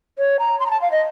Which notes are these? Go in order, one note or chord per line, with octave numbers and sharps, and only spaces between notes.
C#5
A#5
C6
A#5
A5
F5
D#5